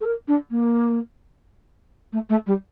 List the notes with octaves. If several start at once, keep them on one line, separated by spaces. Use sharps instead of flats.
A4
A#4
D4
A#3
A3
A3
G3